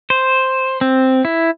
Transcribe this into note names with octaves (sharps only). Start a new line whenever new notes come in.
C5
C4
E4